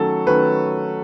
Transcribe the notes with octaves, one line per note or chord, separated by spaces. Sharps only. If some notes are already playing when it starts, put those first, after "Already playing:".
Already playing: D#3 F#3 A3 C#4 A4
D#3 F#3 A3 C#4 B4